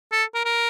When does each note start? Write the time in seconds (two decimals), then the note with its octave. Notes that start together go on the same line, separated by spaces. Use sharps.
0.12 A4
0.35 A#4
0.45 A#4